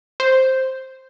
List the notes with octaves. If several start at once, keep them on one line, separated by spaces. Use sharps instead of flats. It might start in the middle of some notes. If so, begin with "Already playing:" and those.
C5